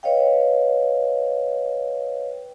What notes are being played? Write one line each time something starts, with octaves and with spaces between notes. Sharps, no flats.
B4 C#5 D#5 F5 G5